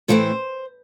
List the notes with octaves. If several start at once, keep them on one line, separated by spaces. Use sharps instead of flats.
A2 E3 A3 C4 C5